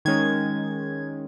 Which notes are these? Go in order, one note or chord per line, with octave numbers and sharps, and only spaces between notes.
D#3 G#3 C#4 G#6